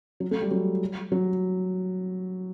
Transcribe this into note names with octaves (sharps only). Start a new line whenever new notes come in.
F#3
A3
G3
F#3
F#3